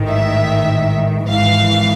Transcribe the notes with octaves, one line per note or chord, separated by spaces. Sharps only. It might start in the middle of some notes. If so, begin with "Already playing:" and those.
Already playing: A1 G#2 D#3
E5
G#1 G#2 E3 F5